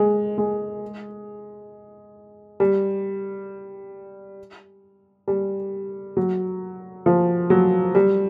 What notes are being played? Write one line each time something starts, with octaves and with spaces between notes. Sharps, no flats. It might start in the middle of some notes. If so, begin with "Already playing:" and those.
Already playing: G#3
G#3
G3
G3
F#3
F3
F#3
G3